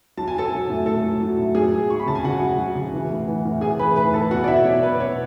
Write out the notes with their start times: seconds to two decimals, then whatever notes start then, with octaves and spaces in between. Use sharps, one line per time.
0.17 F#3 A5
0.28 G#5
0.35 F#3 A4 A5
0.52 F#3
0.70 A2
0.86 A2 A4 A5
1.04 F#3
1.20 F#3
1.39 A2
1.55 F#3 G#4 G#5
1.73 F#3
1.89 F#3 C#6
2.00 B5
2.06 C#3 A5
2.15 G#5
2.24 C#3 F#4 F#5
2.42 F#3
2.58 F#3
2.75 C#3
2.93 E3
3.10 A2
3.28 E3
3.45 A2
3.61 A2 G#4 G#5
3.79 E3 B4 B5
3.96 A2 B4 B5
4.13 E3 A4 A5
4.31 B2 F#4 F#5
4.44 D5
4.47 B2 E4 E5
4.65 F#3 C#5
4.83 B2 B4
4.99 B2 C#5